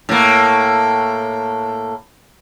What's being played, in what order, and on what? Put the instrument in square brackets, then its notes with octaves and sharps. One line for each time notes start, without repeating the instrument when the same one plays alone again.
[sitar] A2 A#3